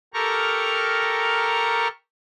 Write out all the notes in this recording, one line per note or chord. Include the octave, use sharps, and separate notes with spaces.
G4 A4 A#4 A#5 C#6 F6